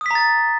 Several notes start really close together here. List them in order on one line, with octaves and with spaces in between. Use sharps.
D#6 B6 A#5 A6